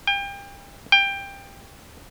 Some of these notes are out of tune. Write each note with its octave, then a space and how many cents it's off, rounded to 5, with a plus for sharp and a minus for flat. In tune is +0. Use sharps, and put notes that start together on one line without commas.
G5 +35
G5 +20